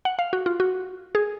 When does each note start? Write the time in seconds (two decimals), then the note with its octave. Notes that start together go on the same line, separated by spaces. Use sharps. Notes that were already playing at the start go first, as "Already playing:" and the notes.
0.05 F#5
0.19 F5
0.33 F#4
0.46 F4
0.60 F#4
1.15 G#4